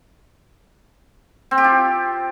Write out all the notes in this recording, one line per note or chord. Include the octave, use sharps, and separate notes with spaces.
C4
G4
F4